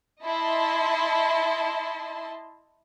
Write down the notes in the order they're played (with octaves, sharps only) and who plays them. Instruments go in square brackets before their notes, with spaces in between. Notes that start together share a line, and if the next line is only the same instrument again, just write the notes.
[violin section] E4 D#5 A5 C6